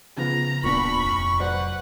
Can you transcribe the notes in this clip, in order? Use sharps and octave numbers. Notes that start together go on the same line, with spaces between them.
C#3 F3 B3 A#5
D1 A#2 B3 D4 B5 C#6
F1
F#3 B4 C5 D5 F#5